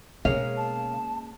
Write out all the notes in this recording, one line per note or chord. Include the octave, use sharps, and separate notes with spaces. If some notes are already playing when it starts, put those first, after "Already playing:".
B2 G#3 A#3 C#4 F5
A5